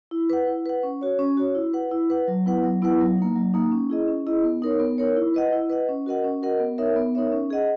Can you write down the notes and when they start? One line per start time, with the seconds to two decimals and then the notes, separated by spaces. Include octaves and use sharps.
0.11 E4
0.30 B4 F#5
0.47 E4
0.66 B4 F#5
0.83 C#4
1.01 F#4 C#5
1.19 C#4
1.37 F#4 C#5
1.55 E4
1.73 B4 F#5
1.91 E4
2.10 B4 F#5
2.28 F#3
2.46 B3 E4 B4 F#5
2.64 F#3
2.82 B3 E4 B4 F#5
3.00 F#3
3.18 A#3 D#4
3.36 F#3
3.54 A#3 D#4
3.72 C#4
3.90 E4 G#4 D#5
4.08 C#4
4.27 E4 G#4 D#5
4.44 B3
4.62 D#4 A#4 C#5
4.80 B3
4.98 D#4 A#4 C#5
5.17 E4
5.34 B4 D#5 F#5
5.52 E4
5.70 B4 D#5 F#5
5.89 C#4
6.06 F#4 A#4 D#5 F#5
6.24 C#4
6.43 F#4 A#4 D#5 F#5
6.60 B3
6.78 D#4 A#4 C#5 E5
6.96 B3
7.15 D#4 A#4 C#5 E5
7.32 C#4
7.50 G#4 D#5 F#5